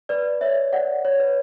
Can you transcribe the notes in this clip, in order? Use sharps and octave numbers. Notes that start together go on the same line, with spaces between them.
B4 D5
C#5 E5
D5 F#5
C#5
B4